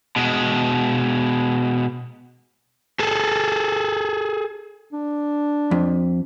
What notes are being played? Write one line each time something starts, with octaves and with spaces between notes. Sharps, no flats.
B2 G#3
G#4 A4
D4
F2